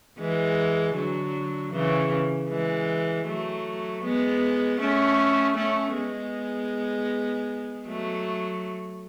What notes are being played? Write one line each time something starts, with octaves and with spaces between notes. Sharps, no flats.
E3 G#3
D3 F#3
C#3 E3
E3 G#3
F#3 A3
G#3 B3
A3 C#4
A3 C#4
G#3 B3
F#3 A3